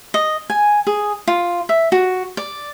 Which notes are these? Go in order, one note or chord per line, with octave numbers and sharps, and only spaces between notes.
D#5
G#5
G#4
F4
E5
F#4
D5